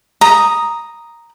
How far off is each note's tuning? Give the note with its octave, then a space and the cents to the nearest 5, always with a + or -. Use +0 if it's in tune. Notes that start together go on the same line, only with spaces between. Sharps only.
A#5 +0 D#6 +0